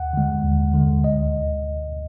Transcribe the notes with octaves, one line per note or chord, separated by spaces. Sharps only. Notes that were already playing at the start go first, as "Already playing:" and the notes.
Already playing: D#2 F#5
D3 G#3
D#2
D3 G#3
D2 D#5